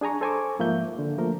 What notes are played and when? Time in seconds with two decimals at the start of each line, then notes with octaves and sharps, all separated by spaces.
0.01 D4 G#4 G#5 A#5 C#6
0.21 A4 C5 G#5 A#5 C#6 D6
0.59 G#2 F3 A#3 E5 G6
0.99 D3
1.18 F3 A3 A#3 A#4